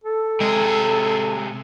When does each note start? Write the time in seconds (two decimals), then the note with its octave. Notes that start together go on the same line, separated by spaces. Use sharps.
0.04 A4
0.40 C3 G#3 G#4